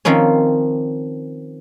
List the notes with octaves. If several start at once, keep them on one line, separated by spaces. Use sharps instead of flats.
D#3 F3 C4 C#4